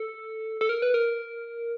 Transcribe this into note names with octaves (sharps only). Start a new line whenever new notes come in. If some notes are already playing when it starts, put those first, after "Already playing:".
Already playing: A4
A4
A#4
B4
A#4